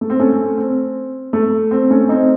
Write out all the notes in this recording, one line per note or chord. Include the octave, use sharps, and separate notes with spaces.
A3
C4
A3 C#4
C4
A3
C4
A3 C#4
C4 D#4